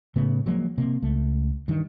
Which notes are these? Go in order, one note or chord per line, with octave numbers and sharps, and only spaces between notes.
A2 C#3 A3 B3
F3 F#3 G#3 A#3
C3 A#3
C#2 A3
G2 D#3